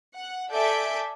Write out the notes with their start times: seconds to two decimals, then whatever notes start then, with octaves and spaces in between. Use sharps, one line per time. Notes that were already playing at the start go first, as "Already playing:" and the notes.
0.14 F#5
0.51 A4 D5 E5 G#5 G6 D7